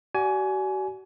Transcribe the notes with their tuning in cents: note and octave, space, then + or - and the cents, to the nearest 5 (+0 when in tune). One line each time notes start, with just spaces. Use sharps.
F#4 +45 D5 -10 G#5 +20